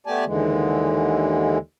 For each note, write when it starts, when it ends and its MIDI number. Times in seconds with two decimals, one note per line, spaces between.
0.07 0.25 57
0.07 0.25 59
0.07 0.25 67
0.07 0.25 74
0.07 0.25 80
0.07 0.25 81
0.26 1.58 39
0.26 1.58 50
0.26 1.58 52
0.26 1.58 56